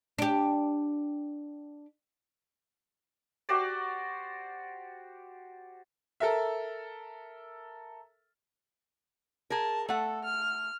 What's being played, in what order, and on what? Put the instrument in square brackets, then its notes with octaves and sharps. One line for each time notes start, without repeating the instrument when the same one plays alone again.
[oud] D4 G4
[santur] F#4 G4 C5 D5
[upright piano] A4 A#4 E5
[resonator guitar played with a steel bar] G#4 A#4 [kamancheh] A5
[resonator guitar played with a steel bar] A3 F#5 [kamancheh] A4
[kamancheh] F6